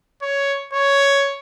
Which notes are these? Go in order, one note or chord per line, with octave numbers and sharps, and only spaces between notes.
C#5
C#5